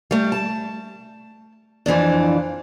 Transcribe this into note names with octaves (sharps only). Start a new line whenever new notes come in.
G3 A3
A5
F2 E3 F3 D4